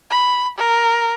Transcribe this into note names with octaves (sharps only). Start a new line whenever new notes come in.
B5
A#4